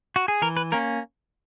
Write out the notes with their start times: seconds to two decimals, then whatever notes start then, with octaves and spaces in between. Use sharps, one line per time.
0.16 F#4
0.28 G#4
0.42 E3 A#4
0.57 B4
0.72 A#3 C#4 A#4